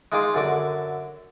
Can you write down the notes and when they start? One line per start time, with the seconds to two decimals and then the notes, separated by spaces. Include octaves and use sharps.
0.12 G#3 D#4 F4 G#4 D6
0.34 F#2 D3 D5